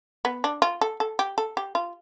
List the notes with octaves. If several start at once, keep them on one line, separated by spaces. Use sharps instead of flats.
B3
D4
F4
A4
A4
G4
A4
G4
F4